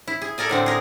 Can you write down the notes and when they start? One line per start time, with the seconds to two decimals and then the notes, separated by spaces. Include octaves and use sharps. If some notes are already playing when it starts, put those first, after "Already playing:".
0.08 E4
0.22 G#4
0.38 A4 A#4 D5 G#5
0.49 A2 D3 C4
0.66 G#4 A#4